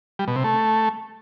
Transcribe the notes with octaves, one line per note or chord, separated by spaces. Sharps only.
G3
B2
C3
A3